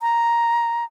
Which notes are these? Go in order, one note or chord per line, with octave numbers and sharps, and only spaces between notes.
A#5